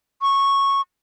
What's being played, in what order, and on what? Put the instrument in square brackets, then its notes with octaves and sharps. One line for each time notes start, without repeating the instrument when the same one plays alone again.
[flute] C#6